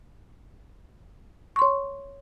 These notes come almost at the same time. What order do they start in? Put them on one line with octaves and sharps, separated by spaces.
C#6 C6 C#5